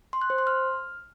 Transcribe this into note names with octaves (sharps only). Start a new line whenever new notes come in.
C6
F#6
C5
C6
F6